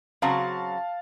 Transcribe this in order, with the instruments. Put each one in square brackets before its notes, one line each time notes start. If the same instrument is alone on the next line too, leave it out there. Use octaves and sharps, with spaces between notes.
[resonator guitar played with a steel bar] C#3 F#3 C4 F#4 [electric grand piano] F5 A5